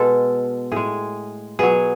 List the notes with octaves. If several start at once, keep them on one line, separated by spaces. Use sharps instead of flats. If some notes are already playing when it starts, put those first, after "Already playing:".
Already playing: B2 G#3 A4
A2 G#3 G#4
B2 F#3 G#4